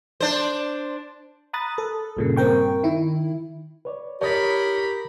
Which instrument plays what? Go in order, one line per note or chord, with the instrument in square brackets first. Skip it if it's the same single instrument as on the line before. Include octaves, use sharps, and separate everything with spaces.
[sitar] D4 C5
[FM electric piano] A#5 B5 D#6 F#6 A6
A4
G2 A#2 C#3
G2 C4 A#4 G5 C#6
D#3 E4
[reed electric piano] B4 C#5 D5
[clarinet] G4 [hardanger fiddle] A#4 B5 [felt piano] C#5 [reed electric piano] A5 D#6 A6